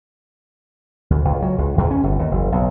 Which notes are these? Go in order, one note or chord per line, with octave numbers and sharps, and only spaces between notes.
D2
C#2
F#3
C#2
E2
C#4
G1
D#2
F#1
B1